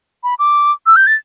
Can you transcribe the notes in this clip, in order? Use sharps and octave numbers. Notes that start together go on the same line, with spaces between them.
B5
D6
E6
G6
A6